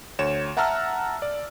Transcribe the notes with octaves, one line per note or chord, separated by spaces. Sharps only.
D2 C#5 E7
E5 F#5 A5 A#5 E6 F6
D5